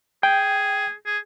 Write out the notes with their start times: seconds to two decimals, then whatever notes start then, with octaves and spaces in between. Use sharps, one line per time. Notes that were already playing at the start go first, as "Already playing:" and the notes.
0.23 G#4 G5
1.06 G#4